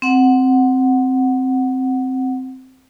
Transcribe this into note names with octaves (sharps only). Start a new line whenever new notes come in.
C4 F#5